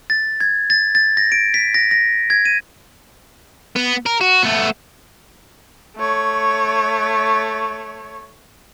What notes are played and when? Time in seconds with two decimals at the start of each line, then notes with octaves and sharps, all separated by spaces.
0.10 A6
0.40 G#6
0.70 A6
0.95 A6
1.17 A#6
1.32 D7
1.54 B6
1.74 A#6
1.91 A#6
2.30 G#6
2.45 D#7
3.76 B3
4.06 A#4
4.21 F#4
4.43 A3 B3
5.97 A3 C#5